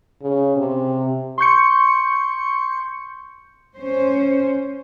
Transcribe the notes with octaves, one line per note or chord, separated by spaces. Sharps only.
C#3
C3
C6 C#6 G6 C#7
C#4 C5